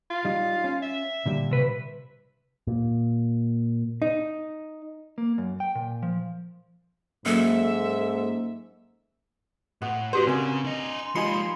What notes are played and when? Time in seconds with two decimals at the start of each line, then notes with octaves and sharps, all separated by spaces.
0.10 F4
0.25 G3 D#4
0.64 C#4
0.82 E5
1.26 A#2 D3 G3
1.51 C3 B4
2.67 A#2
4.02 D#4
5.18 A#3
5.38 F#2
5.60 G5
5.75 A#2
6.03 F3
7.26 G#2 F#3 A#3 C#4 A4 E5
9.82 A2 F#5 D#6
10.13 A3 D4 F#4 G4 B4 C5
10.27 C#3 C4 A#4 G#5
10.65 D4 D#5
10.99 C6
11.15 F3 G#3 D#4 G4 G#5 B5 C7 C#7